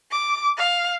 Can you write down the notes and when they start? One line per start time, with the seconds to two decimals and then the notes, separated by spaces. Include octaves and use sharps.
0.12 D6
0.57 F5